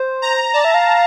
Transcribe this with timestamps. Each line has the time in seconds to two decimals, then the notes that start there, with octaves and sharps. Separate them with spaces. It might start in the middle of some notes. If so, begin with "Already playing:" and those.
Already playing: C5
0.22 A#5
0.53 D5 A5
0.64 E5
0.74 F5